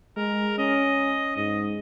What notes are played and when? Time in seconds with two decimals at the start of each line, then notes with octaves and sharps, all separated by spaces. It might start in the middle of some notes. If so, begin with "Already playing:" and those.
0.17 G#3 A#4
0.58 C#4 D#5
1.36 G#2 D#5